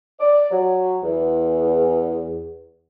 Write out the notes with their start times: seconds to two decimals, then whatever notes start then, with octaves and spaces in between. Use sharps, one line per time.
0.20 D5
0.51 F#3
1.03 E2